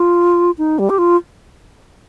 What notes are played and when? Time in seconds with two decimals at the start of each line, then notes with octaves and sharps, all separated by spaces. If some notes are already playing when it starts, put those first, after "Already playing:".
Already playing: F4
0.58 D#4
0.79 G3
0.90 G4
0.98 F4